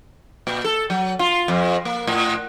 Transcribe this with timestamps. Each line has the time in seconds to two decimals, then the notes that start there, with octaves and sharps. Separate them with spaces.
0.47 A#2
0.64 A4
0.90 F#3
1.19 F4
1.48 F2
1.85 A#3
2.07 A2